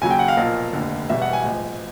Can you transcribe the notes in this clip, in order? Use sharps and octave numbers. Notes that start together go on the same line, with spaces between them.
D#2 C#3 F#3 G#5
G5
F#5
F5
B1 A#2 F3 A#3
F1 D#2 D3
E1 E2 B2 G3 E5
F#5
G#5
A1 G#2 F3 G#3